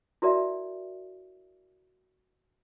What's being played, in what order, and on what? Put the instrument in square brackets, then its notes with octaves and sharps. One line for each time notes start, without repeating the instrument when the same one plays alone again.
[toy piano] E4 F#4 A#4 D5 E5